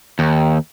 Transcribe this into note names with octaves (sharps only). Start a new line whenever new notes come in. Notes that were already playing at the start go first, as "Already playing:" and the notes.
D#2